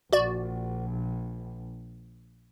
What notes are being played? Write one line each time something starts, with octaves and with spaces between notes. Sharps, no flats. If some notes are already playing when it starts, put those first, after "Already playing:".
A#1 F#4 D5